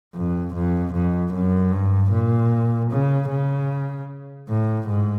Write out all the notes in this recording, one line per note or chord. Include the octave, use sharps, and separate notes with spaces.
F2
F2
F2
F#2
G2
A#2
C#3
C#3
A2
G#2